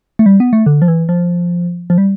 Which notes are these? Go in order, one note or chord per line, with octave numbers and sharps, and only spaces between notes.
A3
G3
B3
A3
D3
F3
E3
F3
F3
G3